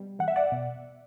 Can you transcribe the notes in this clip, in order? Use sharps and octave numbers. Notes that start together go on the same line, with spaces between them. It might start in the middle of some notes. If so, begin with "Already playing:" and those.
Already playing: B2 G3
E2 F#5
E5
D5 F#5
B2